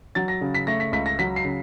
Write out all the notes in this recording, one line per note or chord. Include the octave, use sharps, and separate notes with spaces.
F#3 A6
A#6
C#3
B6
A3 A#6
B6
C#2 B6
A#6
F#3 B6
C7
C#3